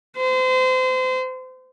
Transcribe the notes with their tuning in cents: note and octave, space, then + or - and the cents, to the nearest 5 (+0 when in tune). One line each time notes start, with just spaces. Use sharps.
C5 -30